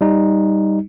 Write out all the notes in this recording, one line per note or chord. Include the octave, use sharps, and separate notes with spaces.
G3 D#4